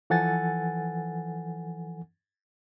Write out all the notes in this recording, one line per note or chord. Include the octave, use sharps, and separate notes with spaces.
E3 F3 A4 F#5 G#5 A6